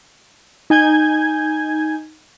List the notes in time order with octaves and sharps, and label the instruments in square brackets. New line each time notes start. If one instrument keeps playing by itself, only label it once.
[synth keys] D#4 G#5 G6 G#6